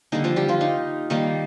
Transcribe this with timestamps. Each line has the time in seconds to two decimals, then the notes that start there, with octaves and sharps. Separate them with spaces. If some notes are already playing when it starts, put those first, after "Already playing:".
0.12 D3 G3 A#3 D#4
0.24 F3 F4
0.36 G3 G4
0.48 F3 F4
0.61 D#4
1.10 D#3 G3 A#3 D#4